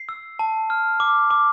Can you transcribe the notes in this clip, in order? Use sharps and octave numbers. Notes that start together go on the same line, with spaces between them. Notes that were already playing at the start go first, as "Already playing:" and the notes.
Already playing: C7
E6
A5
F6
D6
D6